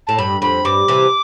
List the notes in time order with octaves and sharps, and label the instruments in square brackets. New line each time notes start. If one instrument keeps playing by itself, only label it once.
[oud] A2 [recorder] A5
[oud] G2 [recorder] B5
[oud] F2 [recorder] B5
[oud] G2 [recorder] D6
[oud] C3 E3